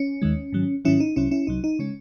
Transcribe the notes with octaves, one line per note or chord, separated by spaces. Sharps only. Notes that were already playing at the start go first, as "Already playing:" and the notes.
Already playing: C#4
D#2 D#3 G#3
G#2 D#3 F#3
G#2 D#3 F#3 C#4 E4
D#4
C2 C3 F#3 C#4 E4
C#4 E4
C2 C3 F#3 D#4
D#4
C#3 G#3 C#4